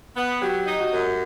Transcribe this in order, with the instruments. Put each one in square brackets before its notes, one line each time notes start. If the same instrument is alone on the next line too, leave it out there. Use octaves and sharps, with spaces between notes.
[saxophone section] B3
[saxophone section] F#3 [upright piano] G4
[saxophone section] D#4
[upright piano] F#4
[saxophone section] F#2